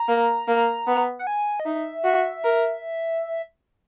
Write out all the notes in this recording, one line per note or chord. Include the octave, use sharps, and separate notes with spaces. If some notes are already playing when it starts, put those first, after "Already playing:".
Already playing: A#5
A#3
A#3
B3
F#5
G#5
D#5
D#4 E5
F#4
A#4